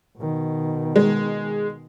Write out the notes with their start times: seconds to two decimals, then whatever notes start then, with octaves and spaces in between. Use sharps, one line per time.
0.18 B2 D#3
0.96 G#3